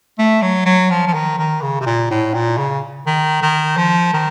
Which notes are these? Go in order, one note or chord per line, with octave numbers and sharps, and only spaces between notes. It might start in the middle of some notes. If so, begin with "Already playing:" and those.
A3
F#3
F#3
F3
F3
D#3
D#3
C#3
C3
A#2
A2
A#2
C#3
D#3
D#3
F3
D#3